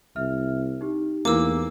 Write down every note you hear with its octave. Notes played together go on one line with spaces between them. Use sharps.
C2 E5 F6
D#4 G4
E2 E3 A#3 D6 E6